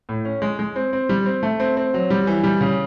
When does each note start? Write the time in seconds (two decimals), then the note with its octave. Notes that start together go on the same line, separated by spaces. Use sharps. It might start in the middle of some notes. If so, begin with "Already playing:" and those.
0.09 A2
0.25 C#4
0.42 G#3
0.59 G#3
0.76 C4
0.93 C4
1.09 G3
1.26 C4
1.43 A3
1.60 C4
1.77 C4
1.94 F#3
2.10 G3
2.27 E3
2.44 G3
2.61 C#3